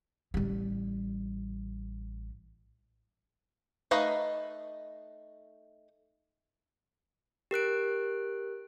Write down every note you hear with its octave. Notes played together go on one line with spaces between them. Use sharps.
A1 G3
A3 D#4 B4 D#5 F5
G4 A#4 F#6 D7